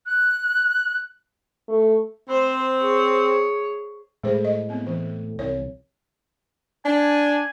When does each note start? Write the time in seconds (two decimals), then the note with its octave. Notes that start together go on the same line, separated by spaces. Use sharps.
0.06 F#6
1.69 A3
2.29 C4 C5
2.78 G#4 C#5
4.24 A2 G#3 G#4 C5
4.45 D#5
4.69 B3 C4
4.87 E3
5.39 C2 C#5
6.85 D4 G#5